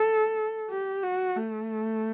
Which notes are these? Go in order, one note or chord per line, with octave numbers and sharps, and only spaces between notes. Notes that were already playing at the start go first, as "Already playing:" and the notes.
Already playing: A4
G4
F#4
A3